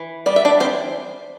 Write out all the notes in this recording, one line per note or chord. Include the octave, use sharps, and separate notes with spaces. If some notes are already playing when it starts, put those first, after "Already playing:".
Already playing: E3
G3 B3 D5
E5
D4 D5
E3 C4 C5